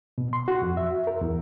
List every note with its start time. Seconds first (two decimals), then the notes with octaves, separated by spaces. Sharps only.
0.18 B2
0.33 C6
0.48 F#4
0.62 F2
0.77 E5
1.07 A#4
1.21 E2